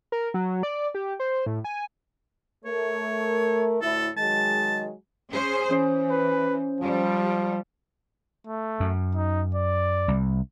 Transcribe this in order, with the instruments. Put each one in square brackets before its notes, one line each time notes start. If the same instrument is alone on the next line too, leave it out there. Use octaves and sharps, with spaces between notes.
[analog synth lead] A#4
F#3
D5
G4
C5
A2
G#5
[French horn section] A3 A#4 [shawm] C#5
[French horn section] D2 A2 E4 [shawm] A4
[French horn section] D#3 F#3 G#3 [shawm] A5
[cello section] C#4 G#4 C5
[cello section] E3 [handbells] C#4 C5
[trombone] B4
[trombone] F3 [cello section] G3
[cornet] A3
[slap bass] F#2
[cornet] D#4
D5
[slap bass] C2